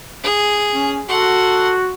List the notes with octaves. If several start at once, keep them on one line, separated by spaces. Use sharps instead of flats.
G#4
C#4
F#4 A4 F#5 C6